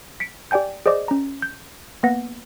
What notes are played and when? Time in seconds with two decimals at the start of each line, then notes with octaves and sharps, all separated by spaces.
0.20 B6 C#7 D7
0.51 G4 D5 G5 G#5 G6
0.86 G#4 C5 D5 D#5 D6
1.08 C#4 A#5
1.42 G6
2.03 A#3 B3 B4 F#5 A#6